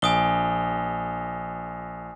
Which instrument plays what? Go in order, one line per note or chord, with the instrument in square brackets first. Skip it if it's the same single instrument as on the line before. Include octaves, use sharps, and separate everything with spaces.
[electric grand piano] A#1 [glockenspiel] G#5 D#6 G7